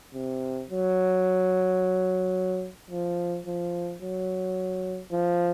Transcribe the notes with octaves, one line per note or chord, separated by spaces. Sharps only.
C3
F#3
F3
F3
F#3
F3